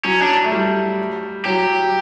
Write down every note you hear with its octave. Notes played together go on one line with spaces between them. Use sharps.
F#3 C#4
D4
A3
G3
F#3 G4